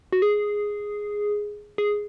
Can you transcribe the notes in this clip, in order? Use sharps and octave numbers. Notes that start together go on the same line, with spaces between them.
F#4
G#4
G#4